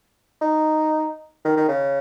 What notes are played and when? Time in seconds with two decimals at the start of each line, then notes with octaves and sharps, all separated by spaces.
0.41 D#4
1.45 D#3
1.56 D#3
1.68 C#3